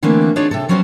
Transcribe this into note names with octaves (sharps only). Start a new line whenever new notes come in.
D3 E3 A3 A#3 C4 D4
D4 D#4 F4 G#4 C#5 D5
C3 A4
F3 F#3 B3 C#4 C5